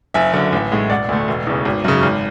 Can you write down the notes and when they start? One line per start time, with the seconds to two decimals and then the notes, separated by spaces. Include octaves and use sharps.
0.14 F#1 E5 G#5
0.33 F#2 D3
0.53 A1
0.72 A2 G#3
0.90 E1 D5 F#5
1.09 D2 D3 A3
1.28 E1
1.47 E2 C#3
1.65 G#1
1.84 F#2 C#3
2.03 G#1